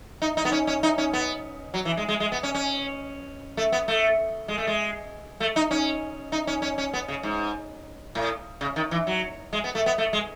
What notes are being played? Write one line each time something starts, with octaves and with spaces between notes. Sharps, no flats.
D#4
D#4
B3
C#4
C#4
D#4
C#4
B3
F#3
E3
G#3
G#3
G#3
B3
C#4
C#4
A3
B3
A3
G#3
A3
G#3
A3
D#4
C#4
D#4
C#4
C#4
C#4
B3
C#3
G#2
A2
C#3
D#3
E3
F#3
G#3
B3
A3
B3
A3
G#3